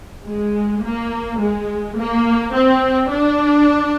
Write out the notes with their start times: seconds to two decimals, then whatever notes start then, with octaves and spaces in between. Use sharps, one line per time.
0.26 G#3
0.83 A#3
1.40 G#3
1.97 A#3
2.53 C4
3.10 D4